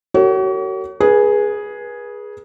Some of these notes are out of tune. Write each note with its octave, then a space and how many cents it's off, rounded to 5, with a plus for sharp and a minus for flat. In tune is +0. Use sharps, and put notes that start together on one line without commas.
F#4 +40 A#4 -45 C#5 +0
G#4 +0 B4 -30